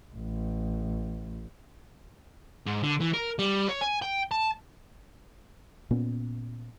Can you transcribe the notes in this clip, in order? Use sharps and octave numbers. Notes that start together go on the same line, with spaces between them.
A1
G#2
D3
E3
A#4
G3
C#5
G#5
G5
A5
A#2 B3 C#4